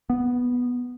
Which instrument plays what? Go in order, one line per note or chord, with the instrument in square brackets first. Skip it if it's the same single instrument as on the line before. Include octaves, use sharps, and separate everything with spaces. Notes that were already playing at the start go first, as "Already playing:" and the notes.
[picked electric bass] B3